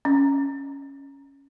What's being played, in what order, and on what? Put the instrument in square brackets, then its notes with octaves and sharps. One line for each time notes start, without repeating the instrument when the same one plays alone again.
[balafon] C#4